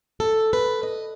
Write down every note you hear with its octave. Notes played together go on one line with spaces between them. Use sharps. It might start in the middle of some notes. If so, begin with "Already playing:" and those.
A4
B4
D#5